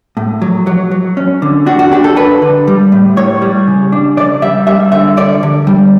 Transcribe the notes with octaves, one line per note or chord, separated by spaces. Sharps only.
A2
F#3
F#3
F#3
C#4
D3
D4 F#4
F#4
D4 G4
A4
D4 B4
D3
G3
A2
A2 C#5
G3
C#3
D4
C#3 D5
G3 E5
G3 E5
D3 E5
D3 D5
D3
G3